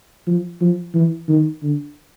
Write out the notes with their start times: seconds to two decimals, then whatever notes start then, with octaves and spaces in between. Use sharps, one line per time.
0.27 F3
0.61 F3
0.94 E3
1.29 D#3
1.63 D3